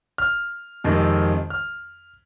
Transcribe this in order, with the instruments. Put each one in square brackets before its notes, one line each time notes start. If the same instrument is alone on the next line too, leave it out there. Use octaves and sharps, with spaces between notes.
[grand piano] F6
F2 C3 D#3 G#3
F6